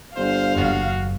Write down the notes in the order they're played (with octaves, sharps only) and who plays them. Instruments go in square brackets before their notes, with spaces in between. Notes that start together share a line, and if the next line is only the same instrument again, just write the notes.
[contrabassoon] G1 [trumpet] C5 [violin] F5
[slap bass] F#1 D#2 [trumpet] F#4